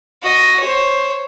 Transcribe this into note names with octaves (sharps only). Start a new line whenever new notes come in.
F#4 D#5
C5 C#5